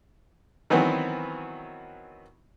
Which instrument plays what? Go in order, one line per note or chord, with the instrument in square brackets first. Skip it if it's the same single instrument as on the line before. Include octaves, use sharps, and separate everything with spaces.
[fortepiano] D#3 E3 F#3 B3 C4